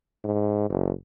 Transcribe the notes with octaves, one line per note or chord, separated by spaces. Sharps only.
G#2
F#1